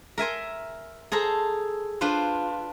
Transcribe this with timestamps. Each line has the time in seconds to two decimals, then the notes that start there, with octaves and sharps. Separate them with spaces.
0.18 A#4 E5 G#5 C6
1.12 G#4 A4 C5 A#5
2.01 D4 F4 B4 C5